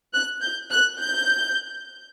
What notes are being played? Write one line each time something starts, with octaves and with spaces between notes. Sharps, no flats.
F#6
G6
F#6
G6